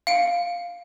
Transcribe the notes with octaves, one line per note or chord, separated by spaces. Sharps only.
F5 C#7 D7